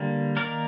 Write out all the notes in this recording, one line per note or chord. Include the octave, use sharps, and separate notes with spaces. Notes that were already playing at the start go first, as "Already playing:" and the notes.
Already playing: D3 G3 A#3
D#3 A#3 A#4 D5